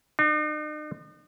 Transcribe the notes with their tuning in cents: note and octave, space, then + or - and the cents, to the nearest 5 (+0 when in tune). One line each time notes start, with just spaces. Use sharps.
D#4 -45